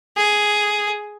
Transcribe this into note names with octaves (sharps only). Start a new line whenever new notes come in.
G#4